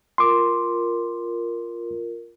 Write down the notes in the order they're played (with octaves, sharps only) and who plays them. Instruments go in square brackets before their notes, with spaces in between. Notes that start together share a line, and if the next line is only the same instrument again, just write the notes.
[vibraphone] F4 A#4 [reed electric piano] C6 D6